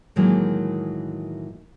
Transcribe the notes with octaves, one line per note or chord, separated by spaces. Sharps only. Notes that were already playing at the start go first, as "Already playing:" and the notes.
A2 D#3 E3 F#3 G#3 A#3